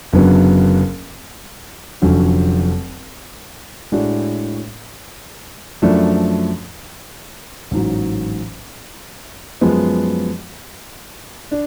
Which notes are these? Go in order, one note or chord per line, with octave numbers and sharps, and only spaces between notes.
F#1 F#2 D3 F#3 B3
F1 F2 D3 F#3 C#4
A2 G#3 D4 F#4
F#2 F3 A3 D4
A1 G#2 F#3
F#2 F3 G#3 B3
D4